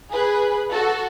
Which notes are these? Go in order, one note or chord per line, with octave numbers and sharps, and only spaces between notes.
G#4 B4
F#4 A4